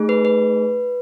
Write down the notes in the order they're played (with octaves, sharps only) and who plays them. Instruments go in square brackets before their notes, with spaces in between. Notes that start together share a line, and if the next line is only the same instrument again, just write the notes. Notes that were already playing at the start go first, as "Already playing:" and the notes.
Already playing: [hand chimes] A3 D#4 G#4
B4
B4